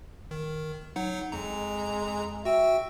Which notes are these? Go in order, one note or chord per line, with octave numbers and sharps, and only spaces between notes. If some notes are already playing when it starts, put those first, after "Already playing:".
D#3
F#3 D#4 F#5
F2 G#3 A#5
F#4 E5 G5